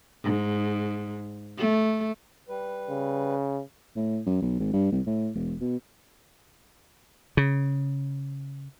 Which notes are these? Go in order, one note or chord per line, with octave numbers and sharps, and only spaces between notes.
G#2
A3
G3 B4
C#3
A2
F#2
B1
G#1
G2
C2
A2
E1
B2
C#3